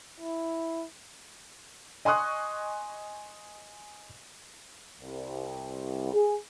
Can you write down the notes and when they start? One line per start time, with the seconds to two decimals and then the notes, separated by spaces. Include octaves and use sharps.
0.20 E4
2.05 D#5 G#5 C6 C#6 D#6 F#6
4.99 C2
6.13 G#4